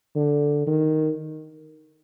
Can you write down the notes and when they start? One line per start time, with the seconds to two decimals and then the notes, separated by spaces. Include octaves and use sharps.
0.15 D3
0.67 D#3